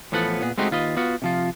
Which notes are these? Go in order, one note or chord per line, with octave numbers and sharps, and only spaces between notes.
A2 E3 F3 B3 A4 F#5
A#2 B3 G#4
G#3 A3 C4 D#4 F#4 G4
D#2 F4 B4 D#5
B3 F4 F#4
C3 F3 F4